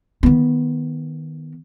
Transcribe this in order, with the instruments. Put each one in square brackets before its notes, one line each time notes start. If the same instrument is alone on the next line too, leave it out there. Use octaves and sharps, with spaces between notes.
[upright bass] D#3 B3